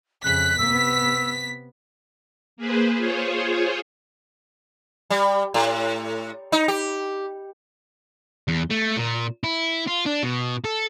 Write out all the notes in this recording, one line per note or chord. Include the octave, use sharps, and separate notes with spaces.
F2 C#3 F#6 B6
C3 B3 E6
A#3 G#4 B4 C5
F4 G#4 C5 C#5
G3
A2
D#4
G4
E2
A3
A#2
E4
F4
D4
B2
A4